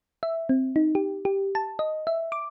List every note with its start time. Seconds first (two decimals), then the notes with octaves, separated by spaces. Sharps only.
0.23 E5
0.49 C4
0.76 D#4
0.95 G4
1.25 G4
1.55 A5
1.79 D#5
2.07 E5
2.32 D6